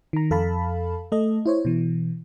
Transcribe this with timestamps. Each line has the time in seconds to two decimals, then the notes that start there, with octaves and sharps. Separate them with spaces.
0.13 D#3 A#5
0.31 F2 A4 F5 A5 B5
1.12 A3 A4 D#5
1.46 E4 C5 C#5
1.65 B2 E3